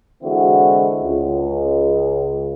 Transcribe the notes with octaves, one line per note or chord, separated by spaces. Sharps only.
D3 E3 G#3 C4 E4 F#4
C#2